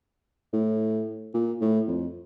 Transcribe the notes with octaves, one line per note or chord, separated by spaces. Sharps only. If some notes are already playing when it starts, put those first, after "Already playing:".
A2
A#2
A2
F2